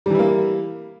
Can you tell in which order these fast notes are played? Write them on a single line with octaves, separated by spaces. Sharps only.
G3 E3 E4 A#3